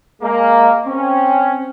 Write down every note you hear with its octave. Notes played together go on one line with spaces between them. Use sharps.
G#3 A#3
C4 C#4